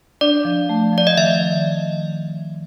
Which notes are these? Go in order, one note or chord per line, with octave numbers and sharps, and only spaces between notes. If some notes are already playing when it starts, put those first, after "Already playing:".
D4 D5
F3
A3
F3 D5
D#5
D#3 E5